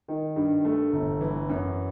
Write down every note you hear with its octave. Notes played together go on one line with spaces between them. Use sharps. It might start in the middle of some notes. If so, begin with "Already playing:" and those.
D#3
G2
A3
G1
E3
F#2